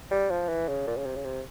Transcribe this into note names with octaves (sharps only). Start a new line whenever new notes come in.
G3
F3
E3
C#3
A#2
C#3
C3
C#3
C3